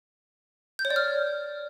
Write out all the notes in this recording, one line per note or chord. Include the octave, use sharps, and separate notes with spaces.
G6
C#5
D5
F6